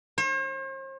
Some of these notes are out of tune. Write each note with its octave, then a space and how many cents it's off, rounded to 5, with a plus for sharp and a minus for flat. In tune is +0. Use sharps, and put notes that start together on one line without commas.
C5 +45